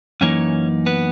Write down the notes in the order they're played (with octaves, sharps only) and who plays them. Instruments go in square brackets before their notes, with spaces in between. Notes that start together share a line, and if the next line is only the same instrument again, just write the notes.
[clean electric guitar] F#2 E3 A#3 C#4 D#4 C#5
B3 B4